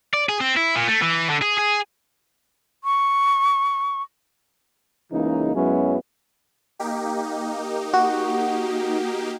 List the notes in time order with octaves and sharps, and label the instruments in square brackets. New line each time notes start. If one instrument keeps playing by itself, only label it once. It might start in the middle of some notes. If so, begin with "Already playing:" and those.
[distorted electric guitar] D5
G#4
C4
E4
A#2
A3
E3
D3
G#4
G#4
[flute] C#6
[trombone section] C#2 C#3 E3 A#3 D#4
F#2 F#3 G#3 B3 C#4 E4
[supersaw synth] A#3 D#4 G4
[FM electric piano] F#4